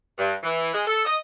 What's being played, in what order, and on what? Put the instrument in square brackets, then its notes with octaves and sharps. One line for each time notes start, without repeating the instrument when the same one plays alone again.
[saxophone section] G2
E3
G#3
A4
D#5